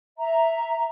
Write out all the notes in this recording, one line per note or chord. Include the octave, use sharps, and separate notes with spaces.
E5 A#5